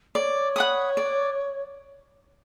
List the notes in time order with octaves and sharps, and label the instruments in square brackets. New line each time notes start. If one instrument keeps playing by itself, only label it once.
[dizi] C#5 [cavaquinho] D5
[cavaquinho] F#5 B5 D#6
D5